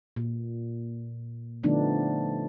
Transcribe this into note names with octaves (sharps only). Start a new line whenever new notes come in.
A#2
D3 F3 A3 B3 D4 D#4